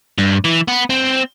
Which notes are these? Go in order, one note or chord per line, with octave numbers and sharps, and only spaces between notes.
G2
E3
B3
C4